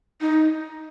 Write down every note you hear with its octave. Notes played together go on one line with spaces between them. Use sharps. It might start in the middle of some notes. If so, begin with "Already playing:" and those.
D#4